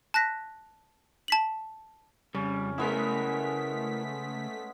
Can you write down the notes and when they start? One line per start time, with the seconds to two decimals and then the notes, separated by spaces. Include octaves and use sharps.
0.14 A5 F#6 A#6 B6
1.28 A5 B6 F#7
2.35 F2 C#3 G3 C#4
2.78 G#3 A3 B3 E4 G#4 A#4 B6